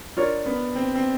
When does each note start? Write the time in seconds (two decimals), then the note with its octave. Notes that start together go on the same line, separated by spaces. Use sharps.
0.17 D4 F4 A#4 C#5
0.46 B3
0.75 C4
0.95 C4